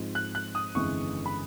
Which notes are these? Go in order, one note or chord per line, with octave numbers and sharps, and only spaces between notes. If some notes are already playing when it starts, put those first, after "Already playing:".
Already playing: G#2 F3 G#3 C4
F#6
F#6
D#6
G1 F2 C#3 E3 G#3 C#6
B5